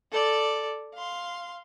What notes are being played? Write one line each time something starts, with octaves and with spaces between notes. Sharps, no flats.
A4 D5
F5 C6